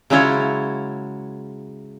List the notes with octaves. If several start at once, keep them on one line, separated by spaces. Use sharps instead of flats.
C#3 F#3 G#3 E4 F4 C#5